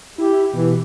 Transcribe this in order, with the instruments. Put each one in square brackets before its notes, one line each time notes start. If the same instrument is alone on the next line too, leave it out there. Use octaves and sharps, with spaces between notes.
[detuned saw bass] E4 [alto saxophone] G4
[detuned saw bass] B2 [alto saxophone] E3